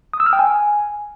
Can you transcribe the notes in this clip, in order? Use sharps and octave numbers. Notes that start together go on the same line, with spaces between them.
D#6
E6
F6
G5
G#5